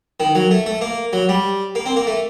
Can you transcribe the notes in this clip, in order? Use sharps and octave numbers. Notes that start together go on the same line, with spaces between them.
D#3
F#3
A3
A3
A#3
F#3
G3
A#3
C4
A#3
A3